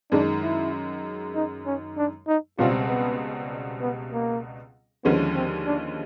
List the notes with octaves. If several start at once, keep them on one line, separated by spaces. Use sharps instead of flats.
F#2 D#3 G#3 D4
E4
D#4
C#4
D4
D#4
C#2 B2 G3 C4 F4
B3
B3
A#3
D#2 D3 F3 G#3 B3 C#4
C4
D4